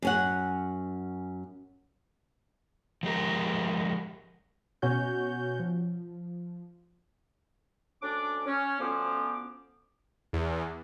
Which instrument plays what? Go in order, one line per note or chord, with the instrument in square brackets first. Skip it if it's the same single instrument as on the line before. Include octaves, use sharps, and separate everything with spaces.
[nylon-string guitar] F#2 C#4 F#5
[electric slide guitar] F3 G#3 G4 A#4
[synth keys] B2 C#4 F#4 C#5 G6
F3
[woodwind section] D2 C#4 D4 D6
C#4
D2 F3 B3 C#4 C5 D6
[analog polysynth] E2